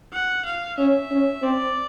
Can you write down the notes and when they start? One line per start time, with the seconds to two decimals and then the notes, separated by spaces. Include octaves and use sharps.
0.13 F#5
0.45 F5
0.78 C#4 E5
1.11 C#4
1.43 C4 D5